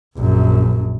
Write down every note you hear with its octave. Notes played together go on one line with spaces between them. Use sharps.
A#1 F#2